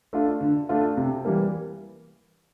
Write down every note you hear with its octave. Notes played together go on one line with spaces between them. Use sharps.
A3 D4 F4
D3
A3 D4 F4
C3
E3 G3 A#3